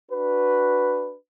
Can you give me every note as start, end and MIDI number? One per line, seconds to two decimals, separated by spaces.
0.11 1.14 62
0.11 1.14 66
0.11 1.14 71